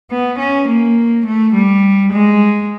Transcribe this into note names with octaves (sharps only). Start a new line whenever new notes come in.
B3
C#4
A#3
A3
G3
G#3